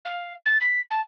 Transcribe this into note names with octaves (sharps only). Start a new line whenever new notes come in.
F5
A6
B6
A5